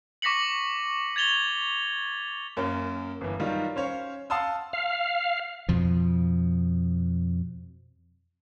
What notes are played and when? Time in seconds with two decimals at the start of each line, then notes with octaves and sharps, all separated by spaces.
0.22 C#6 D6 A#6 B6 C#7 F#7
1.16 G#6 A6 F7 G7
2.57 F#2 A#3 C#4
3.21 G1 E3
3.40 D#3 F#3 G3 D#4 F4
3.76 C#4 C5 C#5 F5
4.30 F5 F#5 A5 C6 D#6 E6
4.73 F5
5.69 F2 B2 F3